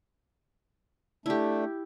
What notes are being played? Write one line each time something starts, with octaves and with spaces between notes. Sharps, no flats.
A3 D4 E4 G4